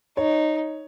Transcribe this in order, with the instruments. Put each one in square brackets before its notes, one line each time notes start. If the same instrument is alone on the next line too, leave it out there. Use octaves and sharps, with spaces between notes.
[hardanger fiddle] D#4 [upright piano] C#5